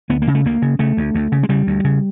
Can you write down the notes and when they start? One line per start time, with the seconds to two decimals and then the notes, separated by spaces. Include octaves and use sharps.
0.10 D2 B3
0.22 A#3
0.27 C#3
0.35 A3
0.45 D2 A#3
0.62 C#3
0.79 C#3 A3
0.97 D2
1.14 D2
1.32 C#3
1.43 G#3
1.49 C#3 G3
1.67 D2
1.84 C#3